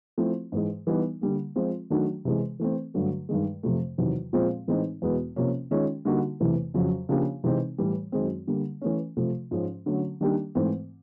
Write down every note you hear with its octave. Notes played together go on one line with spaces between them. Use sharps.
F3 A3 C4 E4
G#2 E3 G#3
E3 G3 B3 D#4
D3 G3 A#3
F3 G#3 C4 F4
D#3 F#3 A3 D4 F#4
C3 E3 G#3
E3 A3 C4
G2 D3 F#3 A3
G2 D#3 G#3
F2 C3 F3 A3
E2 C3 D#3 F#3
A#2 F3 G#3 C4
A2 E3 G#3 C4 D#4
E2 B2 G#3 B3
C3 F3 A#3 C#4
D#3 G#3 C#4 F4
D3 G3 A#3 D#4 F#4
E2 C3 E3 A3
F2 C#3 F#3
C#3 F3 A#3 D4 G4
C3 E3 G#3 C4 D#4
A2 E3 G3
F#2 D#3 G#3 C4
D3 G3 A#3
E3 A3 C#4
C3 F3 A3
G#2 F3 G#3 C#4
D3 F#3 A3 C#4
D#3 G3 A#3 D4 G4
G#2 E3 A3 C4